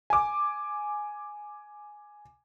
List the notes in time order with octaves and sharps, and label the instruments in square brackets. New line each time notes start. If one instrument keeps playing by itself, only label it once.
[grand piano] G#5 D6